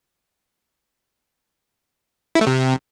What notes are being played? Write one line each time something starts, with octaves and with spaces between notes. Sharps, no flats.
E4
A3
C3